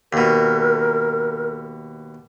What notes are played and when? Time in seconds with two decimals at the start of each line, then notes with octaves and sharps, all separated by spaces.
0.13 D#2 B2 A#4